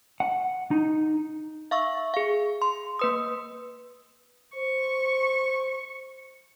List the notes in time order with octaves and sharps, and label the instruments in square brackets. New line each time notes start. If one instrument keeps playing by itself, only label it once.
[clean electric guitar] F#5
D#4
[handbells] E5 F5 C#6 E6
G#4 F5
C6
A#3 B4 D#6
[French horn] C5 [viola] C#6